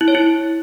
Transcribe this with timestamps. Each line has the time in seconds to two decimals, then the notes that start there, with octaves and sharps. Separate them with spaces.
0.01 E4
0.08 C#5
0.15 E4